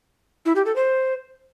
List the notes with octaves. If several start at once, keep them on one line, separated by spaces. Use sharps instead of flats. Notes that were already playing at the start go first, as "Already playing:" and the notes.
E4
G4
A4
C5